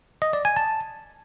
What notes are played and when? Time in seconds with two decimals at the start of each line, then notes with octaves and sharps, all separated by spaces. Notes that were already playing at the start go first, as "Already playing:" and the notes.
0.22 D#5
0.33 D5
0.45 G#5
0.57 A5